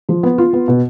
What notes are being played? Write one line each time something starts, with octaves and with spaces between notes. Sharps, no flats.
F3
B3
F4
B3
B2